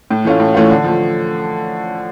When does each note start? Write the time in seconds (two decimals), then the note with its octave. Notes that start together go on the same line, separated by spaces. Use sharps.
0.11 A2
0.25 E3 A3 C#4 F4
0.40 A2
0.54 E3 A3 C#4 F4
0.70 D3
0.84 F3 A3